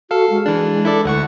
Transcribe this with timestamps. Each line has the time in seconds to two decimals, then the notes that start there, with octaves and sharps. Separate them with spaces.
0.11 F#4 A4 F5
0.30 G#3
0.46 E3 D4
0.85 E4 A4 D5
1.05 D2 F#5 C#6